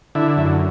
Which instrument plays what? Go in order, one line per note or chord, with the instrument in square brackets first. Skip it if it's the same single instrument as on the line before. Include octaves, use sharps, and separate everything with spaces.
[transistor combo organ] D3 E4
F#2